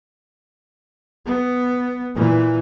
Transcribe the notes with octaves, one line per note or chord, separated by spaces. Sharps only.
B3
A#2 E3